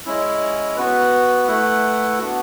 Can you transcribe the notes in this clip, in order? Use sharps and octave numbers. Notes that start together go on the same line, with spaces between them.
G#3 C#4 E4
B3 F#4 B4
A3 E4 B4 F#5
B3 D4 F#4